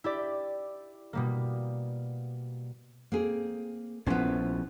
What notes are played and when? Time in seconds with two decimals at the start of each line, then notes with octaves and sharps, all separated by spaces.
0.04 E4 G4 D5
1.13 B2 G3 A#3
3.12 A#3 C4 G#4
4.06 A#1 F3 B3 C#4 E4 C5